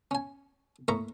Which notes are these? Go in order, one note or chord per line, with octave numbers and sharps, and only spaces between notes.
C#4 G#5
A2 A#3 E5 A#5 C#6